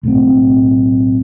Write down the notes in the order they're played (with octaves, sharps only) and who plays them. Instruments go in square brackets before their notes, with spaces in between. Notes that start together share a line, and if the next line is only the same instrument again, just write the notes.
[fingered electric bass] B1 A2 G3 C4